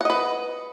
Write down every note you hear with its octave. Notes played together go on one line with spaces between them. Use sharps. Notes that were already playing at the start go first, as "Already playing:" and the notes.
B4 D#5 F#5